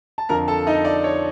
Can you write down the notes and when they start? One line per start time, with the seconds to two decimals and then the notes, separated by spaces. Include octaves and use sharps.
0.18 A5
0.29 F2 D3 F3 A#4 A#5
0.48 A4 A5
0.67 D#4 D#5
0.85 D5
1.04 C#5